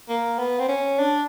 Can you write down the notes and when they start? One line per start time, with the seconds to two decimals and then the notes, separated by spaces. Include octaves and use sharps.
0.09 A#3
0.39 B3
0.59 C4
0.69 C#4
0.99 D4